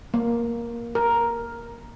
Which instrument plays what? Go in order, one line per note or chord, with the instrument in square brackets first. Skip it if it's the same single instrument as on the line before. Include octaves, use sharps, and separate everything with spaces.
[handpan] A#3
A#4